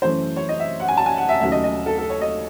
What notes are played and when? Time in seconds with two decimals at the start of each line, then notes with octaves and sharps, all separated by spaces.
0.02 F#2 E3 A3 C#4 C5
0.36 C#5
0.49 D#5
0.59 E5
0.80 F#5
0.88 G#5
0.97 A5
1.06 G#5
1.17 F#5
1.29 E5
1.40 D#2 C#3 F#3 A3 E5
1.52 D#5
1.64 D#5
1.86 A4
1.98 A4
2.10 C#5
2.21 D#5